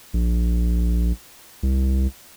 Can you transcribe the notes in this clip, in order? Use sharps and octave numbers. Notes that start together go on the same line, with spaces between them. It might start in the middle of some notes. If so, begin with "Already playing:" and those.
A#1
C2